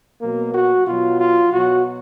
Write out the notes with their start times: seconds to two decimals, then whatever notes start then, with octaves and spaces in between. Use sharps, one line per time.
0.21 B2 F#3 A#3
0.54 F#4
0.86 B2 F#3 F4
1.19 F4
1.52 B2 F#3 F#4